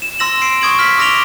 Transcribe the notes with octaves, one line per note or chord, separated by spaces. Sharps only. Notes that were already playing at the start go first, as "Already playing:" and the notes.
E7
C6 E6 A#6 E7 F#7
E6 C7 D7
C#6 D#6 G#6 D7 F#7
F6 B6 F#7
D6 E6 A#6 D7 F7 G7